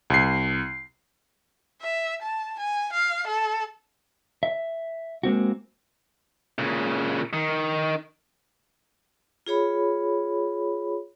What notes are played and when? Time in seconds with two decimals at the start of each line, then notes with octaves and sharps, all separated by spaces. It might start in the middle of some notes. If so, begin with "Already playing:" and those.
0.10 C2 C7
1.81 E5
2.22 A5
2.59 G#5
2.93 F5
3.27 A4
4.43 E5
5.23 G#3 A#3 C4 F#4
6.58 A#2 C#3
7.33 D#3
9.46 F4 G#4 C#5 B5